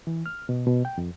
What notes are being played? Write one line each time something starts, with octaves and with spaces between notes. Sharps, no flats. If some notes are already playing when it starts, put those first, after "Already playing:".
E3
F6
B2
B2
G5
F2